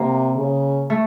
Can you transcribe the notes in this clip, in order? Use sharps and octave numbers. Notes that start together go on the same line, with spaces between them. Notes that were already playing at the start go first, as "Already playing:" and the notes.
Already playing: C3 A#3
C#3
A3